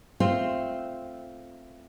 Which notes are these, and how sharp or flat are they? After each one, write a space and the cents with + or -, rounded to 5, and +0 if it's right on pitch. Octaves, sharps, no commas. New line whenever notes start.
A3 +0 C4 +0 F4 -5